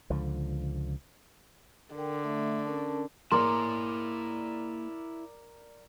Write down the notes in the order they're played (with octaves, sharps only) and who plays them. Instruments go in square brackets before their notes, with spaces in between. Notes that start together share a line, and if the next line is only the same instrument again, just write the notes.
[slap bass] C#2 D3 F3
[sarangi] D3 [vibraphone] A#4 G5
[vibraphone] A3 E5
C#4 A#4 A5
[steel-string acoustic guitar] A#3 G#4 [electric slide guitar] E4 C#5 [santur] A#4 D5 A#5 [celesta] C6